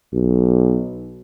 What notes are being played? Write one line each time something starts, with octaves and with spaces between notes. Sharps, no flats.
B1